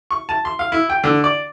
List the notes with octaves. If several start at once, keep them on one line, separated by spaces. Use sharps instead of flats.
C#6
A5
C6
F5
E4
G5
D3
D5